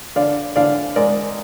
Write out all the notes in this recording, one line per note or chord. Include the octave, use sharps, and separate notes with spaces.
D3 D5 F5
D3 D5 F5
G#3 A#4 D5